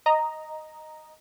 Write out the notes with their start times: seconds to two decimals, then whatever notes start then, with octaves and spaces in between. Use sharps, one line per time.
0.06 D#5 A#5